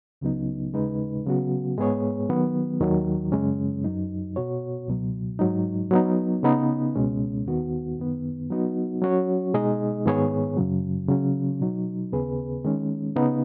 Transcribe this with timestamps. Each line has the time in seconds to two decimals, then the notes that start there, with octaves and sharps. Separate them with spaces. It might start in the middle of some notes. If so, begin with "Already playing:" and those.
0.21 C#2 C#3 F#3 B3 D#4
0.74 D#2 C#3 G#3 D#4 B4
1.26 C#3 F#3 B3 F#4
1.78 G#2 G#3 B3 G#4 C#5
2.29 D#3 F#3 B3
2.81 D#2 D#3 F#3
3.32 F#2 C#3 G#3 C#4
3.84 F#2 F#3 D#4
4.36 B2 B3 F#4 C#5
4.88 C#2 B2 F#3
5.39 G#2 F#3 D#4
5.91 F#3 B3 D#4
6.43 C#3 B3 D#4 B4
6.95 C#2 B2 G#3 C#4
7.46 D#2 D#3 B3 F#4
7.98 F#2 D#3 B3
8.50 F#3 B3 D#4 F#4
9.02 F#3 C#4 F#4 C#5
9.54 B2 G#3 D#4 G#4 D#5
10.06 G#2 D#3 B3 G#4 C#5
10.57 F#2 C#3 F#3
11.09 C#3 F#3 C#4
11.61 B2 F#3 D#4
12.12 D#2 C#3 B3 G#4 B4
12.65 D#3 G#3 C#4
13.16 C#3 B3 D#4